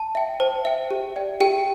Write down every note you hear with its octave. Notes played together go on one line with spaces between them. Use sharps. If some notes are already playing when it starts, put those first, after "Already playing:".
Already playing: A5
E5 G5
C5 A5
E5 G5
G4
D5 G5
G4 G5